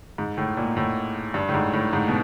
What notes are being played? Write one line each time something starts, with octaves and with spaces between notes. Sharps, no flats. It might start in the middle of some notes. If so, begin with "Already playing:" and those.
G#2
A2
A#2
A2
G2
A2
G#2
A2
G#2
B2